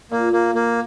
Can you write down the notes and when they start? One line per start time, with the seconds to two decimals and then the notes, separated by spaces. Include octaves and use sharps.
0.11 A#2 A#3
0.33 A#3
0.55 A#3